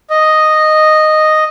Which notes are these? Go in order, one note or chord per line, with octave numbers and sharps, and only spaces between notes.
D#5